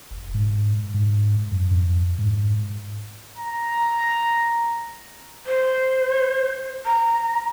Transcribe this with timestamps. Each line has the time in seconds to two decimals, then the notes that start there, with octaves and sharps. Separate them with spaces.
0.11 F1
0.34 G#2
0.94 G#2
1.51 F#2
1.71 F2
2.18 G#2
3.38 A#5
5.46 C5
6.85 A#5